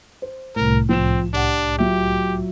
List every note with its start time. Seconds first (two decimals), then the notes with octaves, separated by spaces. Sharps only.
0.22 C5
0.56 C2 A2 A#4
0.89 F3 C4 E7
1.34 D4 G4 F#5
1.79 F#3 F4 G4 E5